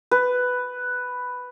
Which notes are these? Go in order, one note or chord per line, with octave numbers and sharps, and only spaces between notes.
B4